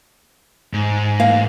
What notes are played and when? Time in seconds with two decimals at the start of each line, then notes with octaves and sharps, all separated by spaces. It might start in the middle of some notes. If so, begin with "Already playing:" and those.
0.73 G#2
1.20 E3 A#3 F5